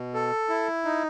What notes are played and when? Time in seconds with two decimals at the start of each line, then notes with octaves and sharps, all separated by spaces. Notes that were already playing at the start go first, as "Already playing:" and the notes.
Already playing: B2
0.14 A4
0.49 E4
0.85 D#4